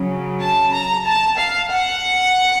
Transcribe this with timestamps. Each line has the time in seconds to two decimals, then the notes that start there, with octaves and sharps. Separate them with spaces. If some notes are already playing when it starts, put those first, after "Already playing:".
Already playing: C#3 F#3
0.41 A5
0.74 A#5
1.05 A5
1.38 F5
1.71 F#5